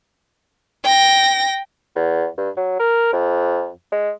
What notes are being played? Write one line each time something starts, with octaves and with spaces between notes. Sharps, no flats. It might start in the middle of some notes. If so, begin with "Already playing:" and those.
G5 A#6
E2
G2
F#3
A#4
F2
G#3